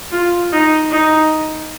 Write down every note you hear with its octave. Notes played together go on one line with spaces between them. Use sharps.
F4
D#4
D#4